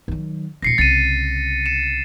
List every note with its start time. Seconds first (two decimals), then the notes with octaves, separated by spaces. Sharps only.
0.08 D#3 F#3
0.62 D#1 A#2 A#6 C7 C#7
0.78 C2 C#3 A6 C7 D#7
1.66 C#7 E7